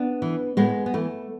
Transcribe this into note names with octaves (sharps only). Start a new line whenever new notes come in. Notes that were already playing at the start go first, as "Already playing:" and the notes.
Already playing: B3 D4
E3
A2 G#3 B3
B3
E3 A3